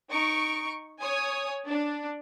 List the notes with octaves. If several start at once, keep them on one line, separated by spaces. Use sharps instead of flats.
D#4 C#6 D7
C#5 G#5 D#6
D4